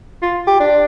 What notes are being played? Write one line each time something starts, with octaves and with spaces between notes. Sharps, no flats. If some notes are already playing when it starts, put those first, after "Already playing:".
F4
G4
D4